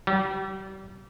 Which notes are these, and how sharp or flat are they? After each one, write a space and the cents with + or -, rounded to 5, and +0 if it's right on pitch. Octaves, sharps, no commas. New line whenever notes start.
G3 -35